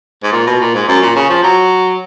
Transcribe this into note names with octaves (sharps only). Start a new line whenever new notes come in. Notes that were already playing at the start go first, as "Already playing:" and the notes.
G#2
A#2
B2
A#2
G#2
F#2
A#2
C#3
F3
F#3